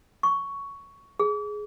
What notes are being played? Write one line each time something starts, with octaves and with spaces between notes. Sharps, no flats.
C#6
G#4